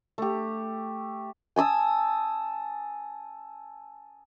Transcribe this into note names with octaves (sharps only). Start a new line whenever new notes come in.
A3 G4
G#5 A5 D#6 E6